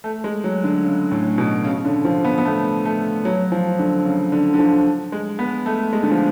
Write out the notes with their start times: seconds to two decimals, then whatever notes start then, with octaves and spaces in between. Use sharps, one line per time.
0.04 A3
0.24 G#3
0.44 F#3
0.64 D3
0.85 C#3
1.11 A2
1.38 B2
1.65 C#3
1.79 C#3
1.85 D3
2.05 F3
2.24 B3
2.38 B3
2.45 A3
2.86 A3
3.25 F#3
3.52 F3
3.79 D3
4.05 C#3
4.32 D3
4.54 D3
4.59 F3
5.12 G#3
5.39 B3
5.66 A3
5.93 G#3
6.03 D3
6.11 F3